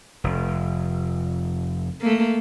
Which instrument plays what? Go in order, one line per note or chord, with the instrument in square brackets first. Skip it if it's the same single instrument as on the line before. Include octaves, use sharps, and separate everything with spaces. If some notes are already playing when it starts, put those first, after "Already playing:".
[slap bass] F1
[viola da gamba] A3 A#3